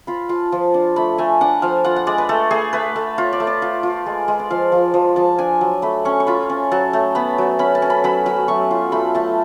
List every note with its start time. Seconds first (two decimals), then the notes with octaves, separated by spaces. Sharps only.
0.07 F4 B5
0.29 F4 A5
0.52 F3
0.74 D4
0.96 A3 B5
1.18 A3 G#5
1.41 D4 F#5
1.62 F3 F5
1.85 F4 F#5
1.96 F#5
2.07 G#3 D5
2.18 B4
2.29 A3 A4
2.51 A3 G#4
2.73 A3 B4
2.96 A3
3.18 F4 C#5
3.33 D5
3.40 A3
3.47 D5
3.62 F4
3.83 F4
4.06 G#3
4.28 G#3
4.39 D5
4.50 F3 F5
4.72 F3
4.94 F3
5.16 F3 A5
5.39 D4 G#5
5.61 F#3
5.82 A3 B5
6.05 C#4 C#6
6.20 C#6
6.27 F4 B5
6.50 C#4
6.72 F#3 A5
6.93 A3
7.15 B3 B5
7.38 F#3
7.59 C#4 B5
7.75 A5
7.82 C#4
7.90 B5
8.04 F#3 B5
8.26 F#3 B5
8.48 A3 C#6
8.71 F4
8.92 A3 B5
9.15 A3 A5